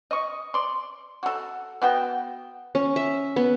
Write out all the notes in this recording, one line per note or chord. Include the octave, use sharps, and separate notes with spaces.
D#5 C#6
D5 C6
F#4 A4
B3 F#4 G5
C#4
E5
B3